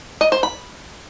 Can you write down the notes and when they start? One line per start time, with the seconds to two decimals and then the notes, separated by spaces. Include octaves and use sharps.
0.21 D#5
0.32 C5
0.43 B5